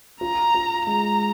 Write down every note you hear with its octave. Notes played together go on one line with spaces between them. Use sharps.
F4 A#5
F4
G#3 A#5